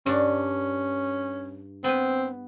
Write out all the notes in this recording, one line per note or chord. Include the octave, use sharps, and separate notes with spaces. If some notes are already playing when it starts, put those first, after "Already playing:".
G2 C#4 D4
B3 C4 B4